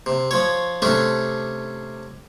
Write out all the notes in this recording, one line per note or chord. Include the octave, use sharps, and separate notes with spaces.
C3
F3 C#5
C3 A3 C#4 D4